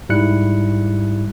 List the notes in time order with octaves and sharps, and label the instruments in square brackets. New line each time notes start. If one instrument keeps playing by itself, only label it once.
[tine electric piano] G#2 G3 E4 F#6 C#7